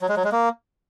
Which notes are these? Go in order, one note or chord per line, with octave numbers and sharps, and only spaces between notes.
F#3
G#3
F#3
G#3
A#3